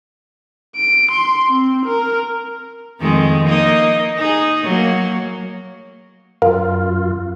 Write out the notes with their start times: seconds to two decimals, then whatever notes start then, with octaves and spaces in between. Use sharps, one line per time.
0.76 D7
1.12 C6
1.49 C4
1.86 A#4
3.00 F2 D#3 G#3
3.46 A#3 D#4 D#5
4.17 D#4 G#4
4.64 F#3 A#3
6.42 F#2 F4 A#4 F5